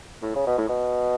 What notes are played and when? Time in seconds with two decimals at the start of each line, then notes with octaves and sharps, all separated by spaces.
0.22 A2
0.36 C#3
0.47 B2
0.58 A2
0.69 B2